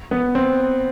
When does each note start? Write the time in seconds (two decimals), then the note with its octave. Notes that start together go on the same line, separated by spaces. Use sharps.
0.11 B3
0.35 C4